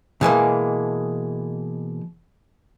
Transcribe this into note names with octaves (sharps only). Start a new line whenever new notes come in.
B2 E3 G#3 A#3